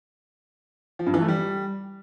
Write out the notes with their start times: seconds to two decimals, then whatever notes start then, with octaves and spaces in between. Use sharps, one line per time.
0.99 F3
1.07 G2
1.14 E3
1.21 A3
1.28 G3